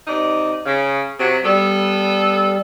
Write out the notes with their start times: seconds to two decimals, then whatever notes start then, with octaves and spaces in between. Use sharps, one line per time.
0.07 C3 D#4 D5
0.66 C#3
1.19 C3 F#3
1.44 G3 B3 A4